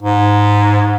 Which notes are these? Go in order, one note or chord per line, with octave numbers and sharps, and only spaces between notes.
G#2